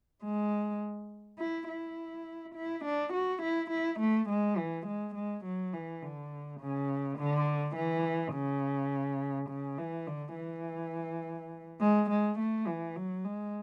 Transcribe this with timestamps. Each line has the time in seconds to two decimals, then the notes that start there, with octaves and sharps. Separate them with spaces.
0.24 G#3
1.39 E4
1.68 E4
2.55 E4
2.85 D4
3.13 F#4
3.42 E4
3.70 E4
4.00 A3
4.29 G#3
4.58 E3
4.87 G#3
5.15 G#3
5.45 F#3
5.74 E3
6.02 D3
6.60 C#3
7.18 D3
7.76 E3
8.34 C#3
9.49 C#3
9.78 E3
10.07 D3
10.36 E3
11.81 G#3
12.10 G#3
12.39 A3
12.67 E3
12.96 F#3
13.24 G#3